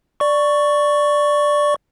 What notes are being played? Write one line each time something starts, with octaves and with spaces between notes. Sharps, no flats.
D5 C#6